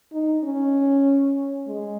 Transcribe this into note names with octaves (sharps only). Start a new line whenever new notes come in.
D#4
C#4
G#3